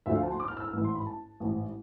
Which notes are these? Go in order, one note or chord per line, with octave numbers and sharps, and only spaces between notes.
D2 D3 F3 E5
F5
A5
C6
D6
F6
E6
F6
A1 G#2 E3 E6
C6
B5
A5
A1 G#2 E3